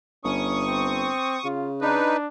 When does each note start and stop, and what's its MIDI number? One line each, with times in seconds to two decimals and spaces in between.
0.24 1.11 31
0.24 0.63 61
0.24 1.48 85
0.24 1.48 87
0.67 1.38 60
1.44 2.02 49
1.44 1.71 65
1.81 2.27 62
1.81 2.17 63
1.81 2.17 71